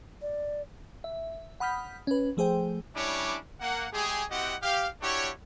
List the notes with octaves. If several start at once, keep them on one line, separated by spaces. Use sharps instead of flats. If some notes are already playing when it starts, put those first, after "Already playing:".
D5
E5
F#5 B5 D#6 F6 G6 B6
C#4 B4
F3 A3 G#4 C5 G5
G3 C#4 D4 E4 C#5 D6
A#3 F#5
G#3 A3 G4 G#4
C4 E4 F#4 G4 D#5 F#5
G4 F5
D4 E4 F#4 G4 C#5